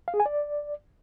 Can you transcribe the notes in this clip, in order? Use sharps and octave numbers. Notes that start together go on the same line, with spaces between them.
F5
G#4
G#5
D5